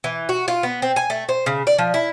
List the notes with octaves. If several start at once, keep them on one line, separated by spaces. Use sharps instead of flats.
E3
F#4
F4
B3
C4
G#5
A3
C5
C#3
D5
F3
E4